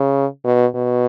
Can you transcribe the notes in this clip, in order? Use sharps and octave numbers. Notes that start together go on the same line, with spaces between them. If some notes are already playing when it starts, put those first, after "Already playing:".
Already playing: C#3
B2
B2